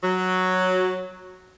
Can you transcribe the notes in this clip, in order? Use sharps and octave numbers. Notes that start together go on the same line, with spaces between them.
F#3